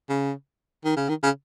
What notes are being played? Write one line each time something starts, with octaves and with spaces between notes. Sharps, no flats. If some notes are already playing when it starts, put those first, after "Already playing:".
C#3
D#3
C#3
D#3
C#3